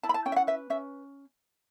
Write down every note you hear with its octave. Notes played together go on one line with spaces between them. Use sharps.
E4 A5
B5
A5
C#4 G5
E5
F#5
B4 E5
C#4 E5